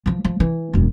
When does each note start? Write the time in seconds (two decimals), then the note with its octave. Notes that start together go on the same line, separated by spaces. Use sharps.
0.06 E3 F3
0.25 F3
0.40 E3
0.73 E1 F#2